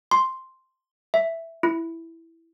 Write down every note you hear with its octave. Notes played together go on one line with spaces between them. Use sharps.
C6
E5
E4